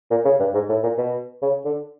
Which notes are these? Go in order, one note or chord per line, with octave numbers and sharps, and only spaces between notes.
A#2
C#3
G2
G#2
A2
A#2
B2
C#3
D3